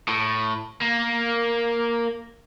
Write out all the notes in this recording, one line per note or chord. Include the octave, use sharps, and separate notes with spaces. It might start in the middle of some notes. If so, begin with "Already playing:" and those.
A2
A#3